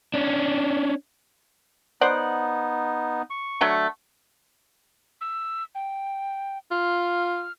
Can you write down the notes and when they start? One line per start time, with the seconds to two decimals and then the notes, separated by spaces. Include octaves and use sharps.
0.14 C#4 D4
2.01 B3 D#4 C5 D5 F#5
3.30 C#6
3.61 D3 F#3 A3
5.21 E6
5.75 G5
6.71 F4 F6